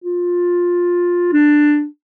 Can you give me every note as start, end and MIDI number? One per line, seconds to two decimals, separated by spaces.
0.04 1.28 65
1.33 1.86 62